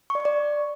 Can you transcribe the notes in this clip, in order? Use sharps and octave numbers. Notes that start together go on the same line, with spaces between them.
C#6
D5
C#6
D5